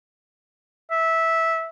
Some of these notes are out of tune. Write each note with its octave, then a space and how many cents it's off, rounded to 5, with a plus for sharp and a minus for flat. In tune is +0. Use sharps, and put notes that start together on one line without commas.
E5 -10